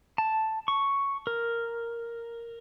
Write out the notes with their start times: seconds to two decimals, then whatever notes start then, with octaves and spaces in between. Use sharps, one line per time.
0.18 A5
0.68 C#6
1.27 A#4